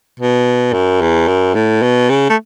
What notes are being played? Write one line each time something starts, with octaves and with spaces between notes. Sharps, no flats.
B2
F#2
E2
F#2
A2
B2
C#3
A3